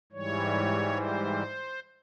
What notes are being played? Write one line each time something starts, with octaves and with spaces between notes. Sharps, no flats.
G#2 E3 G3 C#5
C5